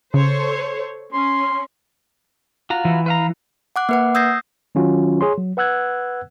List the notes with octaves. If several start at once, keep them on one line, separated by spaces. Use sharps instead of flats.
C#3 A4 C5 C#5
C#4 C6
F4 F#4 A#5
E3
B4 F5 A#5
F#5 D6 F#6
A#3 B4 F#5
D#6 E6 G6 G#6 A#6 C7
D#3 F#3 C#4 F4 F#4
G#4 C#5 C6
F#3
B4 F#5 E6 F#6 G#6